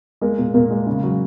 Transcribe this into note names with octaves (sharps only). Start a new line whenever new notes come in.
G#3 A#3
A#2
A#2 A#3
G#3
C#3
F#3